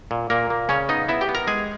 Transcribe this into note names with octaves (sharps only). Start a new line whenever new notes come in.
A#2
A#2 A#3 A#4
A#3
C#3 C#4 C#5
B3 D#4 D#5
B3 E4 E5
G4 G5
B3
A#4 A#5
G#3 G#4 G#5